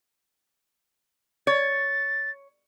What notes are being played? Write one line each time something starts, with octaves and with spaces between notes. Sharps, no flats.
C#5 A6